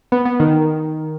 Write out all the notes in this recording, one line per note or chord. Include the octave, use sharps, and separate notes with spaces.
B3
B3
D#3